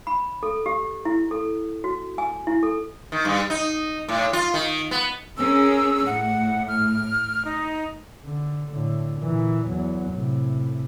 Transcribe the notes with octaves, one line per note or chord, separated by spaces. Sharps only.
B5
A4
G4
E4
A4
F#4
G#5
E4
A4
D#3
G2
D#4
A2
F4
D#3
B3
C#4 G#4 A#4 E6
A2 F#5
F6
D#4
D3
A2 D3
A#2 E3
E2 F#3
A2 C3